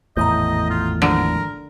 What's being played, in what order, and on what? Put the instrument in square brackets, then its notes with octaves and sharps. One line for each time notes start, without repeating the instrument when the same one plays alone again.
[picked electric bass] G#1 E2 A2 [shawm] D#5 [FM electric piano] A#5 D#6 G6
[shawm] F4
[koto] D3 [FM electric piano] D#3 F3 G#3 [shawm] A#4